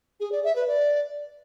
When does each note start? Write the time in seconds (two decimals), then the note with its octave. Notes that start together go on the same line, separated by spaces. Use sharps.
0.20 G#4
0.32 D5
0.44 E5
0.56 B4
0.68 D5